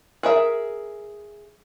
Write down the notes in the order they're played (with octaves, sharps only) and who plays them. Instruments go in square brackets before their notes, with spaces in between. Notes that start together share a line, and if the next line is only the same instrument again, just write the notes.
[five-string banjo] G#4 A#4 E5